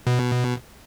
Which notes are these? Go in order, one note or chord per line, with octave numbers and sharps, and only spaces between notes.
B2